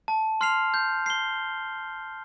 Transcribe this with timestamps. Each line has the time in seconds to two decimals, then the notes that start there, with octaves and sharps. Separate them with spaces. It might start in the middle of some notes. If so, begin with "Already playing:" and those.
0.08 A5
0.41 C6 F6 C7 F7
0.74 G6
1.06 C7 G7